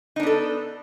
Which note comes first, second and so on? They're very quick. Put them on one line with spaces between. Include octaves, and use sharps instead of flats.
D#4 D4 B3 A4